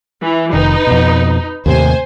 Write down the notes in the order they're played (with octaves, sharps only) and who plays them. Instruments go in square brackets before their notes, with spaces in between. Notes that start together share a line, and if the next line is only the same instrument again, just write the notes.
[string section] E3
[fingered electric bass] F1 D#3 [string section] D#4 B4
[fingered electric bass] F2 B2
[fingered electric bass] D#2 A2 C3 [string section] C5 G#5